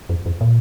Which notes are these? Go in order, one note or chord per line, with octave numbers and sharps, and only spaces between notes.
F2
F2
A#2